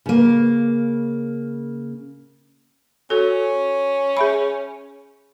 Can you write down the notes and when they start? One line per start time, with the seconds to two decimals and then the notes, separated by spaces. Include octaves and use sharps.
0.06 C#3 A#3
3.10 C#4 F#4 A4
4.17 G#4 E5 B5